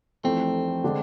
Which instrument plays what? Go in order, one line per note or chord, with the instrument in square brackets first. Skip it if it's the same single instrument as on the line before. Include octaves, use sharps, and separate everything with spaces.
[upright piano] F1 F2 E3 A3 [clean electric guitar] C4
[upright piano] D3 G#3 D4